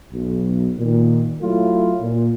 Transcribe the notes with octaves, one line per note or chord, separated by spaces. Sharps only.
B1
A#2 D#3
F#3 A3 E4 F4
A#2